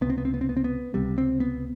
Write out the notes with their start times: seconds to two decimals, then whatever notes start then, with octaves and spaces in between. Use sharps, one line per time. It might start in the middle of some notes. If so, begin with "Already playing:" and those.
0.01 C#2 C3 B3
0.10 C4
0.18 B3
0.25 C4
0.34 B3
0.41 C4
0.49 B3
0.57 C4
0.64 B3
0.94 C#2 C3 G3
1.18 C4
1.40 B3